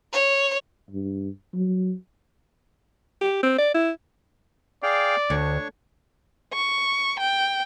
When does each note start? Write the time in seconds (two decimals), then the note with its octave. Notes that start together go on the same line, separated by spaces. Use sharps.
0.12 C#5
0.90 G2
1.55 F#3
3.21 G4
3.43 C4
3.58 D5
3.74 E4
4.83 G#4 D5 F5 G5
5.30 D2 D4 C#5 C#6
6.54 C#6
7.20 G5